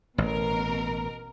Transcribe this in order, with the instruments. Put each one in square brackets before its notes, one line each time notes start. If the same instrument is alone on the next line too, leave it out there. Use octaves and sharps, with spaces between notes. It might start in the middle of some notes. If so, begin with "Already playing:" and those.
[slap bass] A1 [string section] B2 A#4